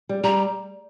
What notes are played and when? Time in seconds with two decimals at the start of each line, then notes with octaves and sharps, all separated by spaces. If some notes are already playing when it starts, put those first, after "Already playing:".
0.09 G3
0.24 G3 A#5